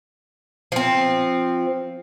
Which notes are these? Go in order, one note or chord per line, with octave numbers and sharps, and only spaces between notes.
F3 C4